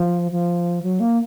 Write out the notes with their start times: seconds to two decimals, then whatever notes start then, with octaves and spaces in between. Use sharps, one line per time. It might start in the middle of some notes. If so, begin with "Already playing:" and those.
Already playing: F3
0.32 F3
0.83 F#3
1.00 A#3